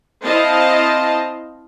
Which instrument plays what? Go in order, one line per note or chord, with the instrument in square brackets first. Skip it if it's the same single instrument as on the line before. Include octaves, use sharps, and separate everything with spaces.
[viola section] C4 E4 C5 D#5 F5 A5